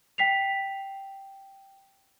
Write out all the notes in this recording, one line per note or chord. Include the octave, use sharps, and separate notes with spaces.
G5 B6 C7 F7